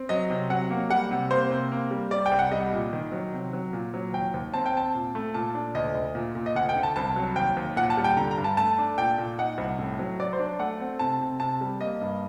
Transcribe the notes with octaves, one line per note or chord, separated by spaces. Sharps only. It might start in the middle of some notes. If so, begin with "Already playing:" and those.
Already playing: C4
F#3 D#5
C3
F#3 F#5
A#3
G3 F#5
C3
A#3 C5
C3
A#3
G3
G3 D5
G5
C2
F#5
G3 D#5
A#2
D#3
F#3
C3
F#3
A#2
F#3
D#2 G5
D#2
C4 A5
G5
C4 A5
A#2
A3
A#2 A5
D4
D2 D#5
D2
A#2
A#2
D#5
D2 F#5
G5
D3
A5
C2 A5
F#3
D#2 G5
D#2
A#2 F#5
A5
G3
G5
D3 A#5
A#5
G2
A5
A3 A5
D4
A#2 G5
A#2
D#4 F#5
C2
A2
F#3
F#3 D5
C5
D4
A3 F#5
C4
C3 A5
C3
C3 A5
G3
A#3 D#5
G2